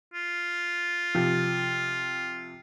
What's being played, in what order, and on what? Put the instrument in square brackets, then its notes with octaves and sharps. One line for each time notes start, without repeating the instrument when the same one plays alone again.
[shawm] F4
[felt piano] C3 F3